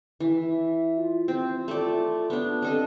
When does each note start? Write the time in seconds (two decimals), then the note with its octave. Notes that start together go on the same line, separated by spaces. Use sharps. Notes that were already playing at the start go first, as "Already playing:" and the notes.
0.20 E3 E5
0.97 F4
1.28 C4
1.68 A3 F4 D5
2.30 B3 D4
2.62 C4 D4 A4 D#5